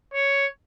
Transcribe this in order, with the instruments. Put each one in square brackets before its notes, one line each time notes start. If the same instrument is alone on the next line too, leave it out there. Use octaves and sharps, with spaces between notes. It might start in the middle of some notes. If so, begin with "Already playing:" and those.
[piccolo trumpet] C#5